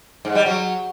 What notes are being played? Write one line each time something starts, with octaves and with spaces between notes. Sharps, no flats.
G#2
G3
F#3